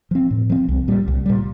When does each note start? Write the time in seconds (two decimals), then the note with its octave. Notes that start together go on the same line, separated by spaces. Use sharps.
0.11 F3 C4
0.31 A2
0.50 F3 C4
0.69 C2
0.88 A#2 G3
1.08 C2
1.26 A#2 G3